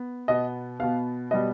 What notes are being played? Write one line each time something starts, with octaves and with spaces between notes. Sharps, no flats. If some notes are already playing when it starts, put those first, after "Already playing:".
Already playing: B3
B2 B3 D#5
B2 B3 F5
B2 G3 B3 D#5